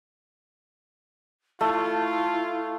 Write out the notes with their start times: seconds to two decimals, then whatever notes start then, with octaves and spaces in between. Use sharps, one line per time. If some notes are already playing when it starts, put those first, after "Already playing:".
1.61 A3 E4 F4